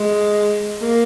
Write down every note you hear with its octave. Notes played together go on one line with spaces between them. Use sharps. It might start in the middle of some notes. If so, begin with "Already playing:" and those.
Already playing: G#3
A#3